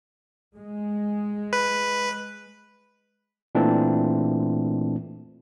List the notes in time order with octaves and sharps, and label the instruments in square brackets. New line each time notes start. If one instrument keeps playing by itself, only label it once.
[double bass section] G#3
[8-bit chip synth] B4
[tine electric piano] A#2 E3 A3 C4 D4